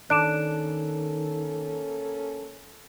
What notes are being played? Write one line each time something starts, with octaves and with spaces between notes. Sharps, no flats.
D#3 A#3 C#4 D4 A4 F#6 D7 E7